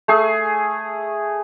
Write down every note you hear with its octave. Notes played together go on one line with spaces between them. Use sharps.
A3 G#4